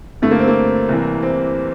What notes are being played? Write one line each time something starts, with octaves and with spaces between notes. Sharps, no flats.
G2 D3 A3
A#3
C4
A#3
C2 C3 E3
C4